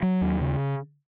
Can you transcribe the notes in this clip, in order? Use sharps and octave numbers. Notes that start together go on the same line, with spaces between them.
F#3
D#2
C#3